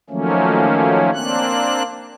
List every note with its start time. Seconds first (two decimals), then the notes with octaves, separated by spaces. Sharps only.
0.10 D#3 F3 F#3 A3 A#3 C#4
1.14 A#3 C4 D4 F#6